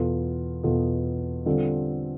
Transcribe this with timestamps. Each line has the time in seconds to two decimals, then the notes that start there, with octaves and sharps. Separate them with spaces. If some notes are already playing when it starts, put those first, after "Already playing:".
Already playing: E2 B2 B3 F4 A4
0.63 E2 B2 B3 F4 A4
1.46 D3 G3 C4 F4 A4